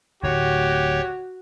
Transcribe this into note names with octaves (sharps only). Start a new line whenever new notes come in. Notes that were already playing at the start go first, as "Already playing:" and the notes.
D1 A2 D3 F#4 G4 C#5